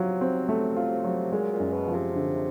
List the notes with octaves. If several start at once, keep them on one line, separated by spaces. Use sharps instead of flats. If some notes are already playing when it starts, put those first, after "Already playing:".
Already playing: C3 F#3 F4
C4
A3
F4
F#3
A#2 G#3
A#2
F#2
B2
F3
C3
D3